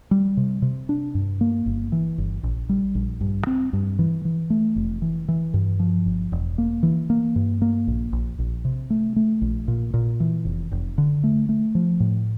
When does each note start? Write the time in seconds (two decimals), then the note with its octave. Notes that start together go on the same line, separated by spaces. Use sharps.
0.11 G3
0.37 C3
0.62 C3
0.89 D4
1.15 G2
1.41 A#3
1.66 G1
1.92 E3
2.18 G1
2.43 A#1
2.69 G3
2.95 A#1
3.21 G2
3.47 C4
3.73 G2
3.99 E3
4.25 E3
4.50 A3
4.76 F1
5.02 E3
5.28 E3
5.54 G2
5.80 F3
6.06 G1
6.32 E1
6.58 A#3
6.83 E3
7.10 A#3
7.36 G2
7.62 A#3
7.87 A#1
8.12 A#1
8.39 A#1
8.65 C3
8.90 A3
9.16 A3
9.42 A#1
9.68 A#2
9.94 A#2
10.20 E3
10.45 F1
10.72 F1
10.98 D3
11.24 A3
11.49 A3
11.75 F3
12.00 A2